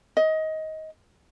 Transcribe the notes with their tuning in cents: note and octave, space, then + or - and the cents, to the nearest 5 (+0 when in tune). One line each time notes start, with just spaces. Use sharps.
D#5 +20